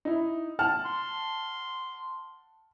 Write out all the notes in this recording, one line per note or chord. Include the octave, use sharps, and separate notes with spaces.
D#4 E4
F#5 A5 F6
C6